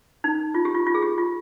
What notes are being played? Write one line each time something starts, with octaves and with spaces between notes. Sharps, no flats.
D#4
F4
G4
F4
F4
G#4
G4
F4